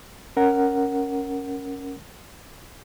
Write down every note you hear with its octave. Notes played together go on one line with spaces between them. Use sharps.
C#4 A#4 F#5